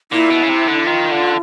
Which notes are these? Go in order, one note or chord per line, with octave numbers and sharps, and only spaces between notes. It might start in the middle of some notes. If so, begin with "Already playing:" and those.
A#2 E4
B2
C#3
C3
D3
D#3 F4
D3